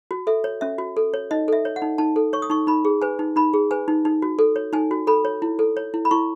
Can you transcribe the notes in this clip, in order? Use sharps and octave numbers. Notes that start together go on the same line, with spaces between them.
F#4
A4 E5
C#5
C#4 E5
F#4
A4
C#5
D#4 D#5
A4 E5
C#5
F#5
D#4
D#4 A5
A4
C#5 C#6
D#6
D#4 C#6
D#4 B5
G#4
B4 G#5
D#4
D#4 B5
G#4
B4 G#5
D#4
D#4
F#4
A4
C#5
D#4 G#5
F#4
A4 B5
C#5
E4
A4
C#5
E4
B5
E4 C#6